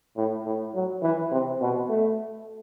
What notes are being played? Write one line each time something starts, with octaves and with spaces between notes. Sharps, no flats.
A2
A2
F#3
E3
C3
B2
A3